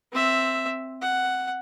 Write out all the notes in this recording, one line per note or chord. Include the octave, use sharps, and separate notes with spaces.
C4 E5
F#5